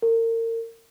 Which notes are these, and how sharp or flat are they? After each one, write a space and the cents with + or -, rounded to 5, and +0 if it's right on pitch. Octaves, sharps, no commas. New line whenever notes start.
A#4 -35